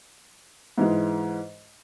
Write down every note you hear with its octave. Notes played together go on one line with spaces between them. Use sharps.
G#2 E3 G#3